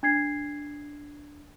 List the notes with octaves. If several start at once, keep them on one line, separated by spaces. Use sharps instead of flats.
D4 G#6 C7